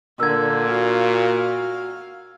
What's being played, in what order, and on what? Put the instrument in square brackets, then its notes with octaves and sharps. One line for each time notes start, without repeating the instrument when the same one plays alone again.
[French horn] A#2 [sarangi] D3 [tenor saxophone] A#4 [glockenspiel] E6 G#6
[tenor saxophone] F#4 [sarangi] F5